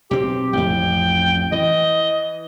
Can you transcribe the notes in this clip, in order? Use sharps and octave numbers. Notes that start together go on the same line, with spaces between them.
B1 C4 G4
A1 F2 G5
E3 D#5